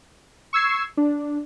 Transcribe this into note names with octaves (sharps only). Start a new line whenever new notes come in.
C#6 E6 G#6 C7
D4